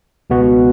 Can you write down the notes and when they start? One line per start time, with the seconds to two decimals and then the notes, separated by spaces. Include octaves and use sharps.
0.30 C#2 B2 B3 F#4